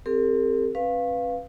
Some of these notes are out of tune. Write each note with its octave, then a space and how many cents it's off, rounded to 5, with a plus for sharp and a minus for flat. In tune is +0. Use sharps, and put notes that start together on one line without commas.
C4 +0 G4 +35 A#4 -45
C#4 -35 B4 +0 F5 +0